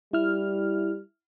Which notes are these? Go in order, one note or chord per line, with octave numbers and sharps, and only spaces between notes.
G3 E4 F6